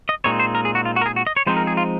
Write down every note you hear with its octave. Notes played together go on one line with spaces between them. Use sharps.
D#5
A#2 G#3 C4 D#4 C#5
C5
A#4
G#4
F#4
F4
F#4
A#4
G#4
F#4
D#5
C#5
F3 G#3 C4 D#4 C5
A#4
G#4
F4